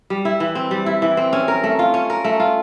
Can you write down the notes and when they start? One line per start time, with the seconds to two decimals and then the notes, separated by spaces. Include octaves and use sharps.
0.10 G3
0.25 E4
0.40 E3
0.55 C4
0.71 G3
0.86 E4
1.02 E3
1.17 C4
1.33 C#4
1.48 A#4
1.64 A3
1.79 F4
1.94 C#4
2.10 A#4
2.24 A3
2.40 F4